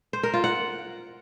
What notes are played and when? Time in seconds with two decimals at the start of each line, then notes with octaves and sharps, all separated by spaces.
0.13 C5
0.23 A#4
0.34 F4
0.44 F#5